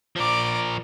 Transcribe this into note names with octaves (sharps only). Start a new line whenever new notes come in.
F3 A#4 D5 D6